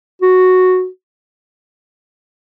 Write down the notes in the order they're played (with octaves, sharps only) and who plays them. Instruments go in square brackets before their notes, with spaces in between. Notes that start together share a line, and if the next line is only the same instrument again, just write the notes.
[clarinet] F#4